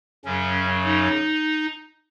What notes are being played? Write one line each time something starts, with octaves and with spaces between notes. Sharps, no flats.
F#2 C#3 F#3 C#4
D#4